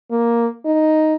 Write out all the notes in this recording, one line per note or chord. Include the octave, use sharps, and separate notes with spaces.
A#3
D#4